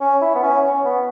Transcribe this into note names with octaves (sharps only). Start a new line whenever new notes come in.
C#4
E4
B3
C#4
C#4
B3